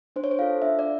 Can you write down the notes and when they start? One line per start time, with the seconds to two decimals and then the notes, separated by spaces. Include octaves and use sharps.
0.16 D4 C5
0.24 C#5
0.31 C5
0.39 F4 A4 F5
0.62 D4 E5
0.79 D5